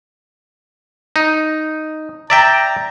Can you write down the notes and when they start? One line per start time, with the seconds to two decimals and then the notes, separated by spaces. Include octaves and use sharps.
1.16 D#4
2.30 D5 E5 G5 A#5